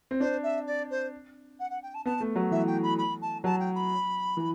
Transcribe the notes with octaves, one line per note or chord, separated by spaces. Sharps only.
C4
D4 C5
E5
D5
C5
F#5
F#5
G5
A5
B3 A5
A3
F#3
E3 E5
G5
B5
B5
A5
F#3 A5
G5
B5
E3